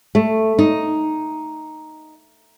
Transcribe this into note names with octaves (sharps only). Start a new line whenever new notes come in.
A3
D#4